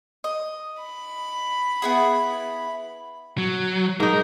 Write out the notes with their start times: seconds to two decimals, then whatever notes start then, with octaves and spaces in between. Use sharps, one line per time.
0.24 D#5
0.83 B5
1.82 B3 E4 G#4
3.38 F#3
4.00 G#2 D#4 A#4